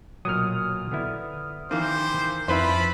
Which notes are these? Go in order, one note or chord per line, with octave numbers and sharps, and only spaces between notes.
B1 A#2 F#3 D#6 F6
D3 B3 E4
D#3 E3 A#3 G4 C5
F2 E4 F4 B4 C5 A5 B5